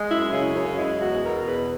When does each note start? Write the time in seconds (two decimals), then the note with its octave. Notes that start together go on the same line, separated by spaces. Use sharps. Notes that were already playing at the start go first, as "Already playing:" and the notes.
Already playing: G#3
0.11 F#2 E4
0.32 C#3 C#4
0.55 F#2 C#4
0.78 G#3 E4
1.00 E2 F#4
1.23 B2 A#4
1.46 E2 B4